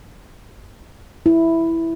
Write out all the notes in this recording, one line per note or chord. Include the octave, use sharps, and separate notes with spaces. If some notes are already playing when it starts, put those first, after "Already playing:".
E4